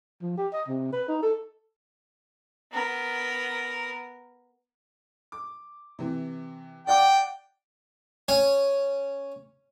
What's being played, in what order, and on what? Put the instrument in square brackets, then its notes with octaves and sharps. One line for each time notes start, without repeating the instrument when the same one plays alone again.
[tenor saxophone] F3
G4
D#5
C3
B4
D#4
A4
[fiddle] B3 A#4
[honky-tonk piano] D6
C3 E3
[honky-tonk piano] D5 F#5 D6 [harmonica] G5
[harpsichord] C#4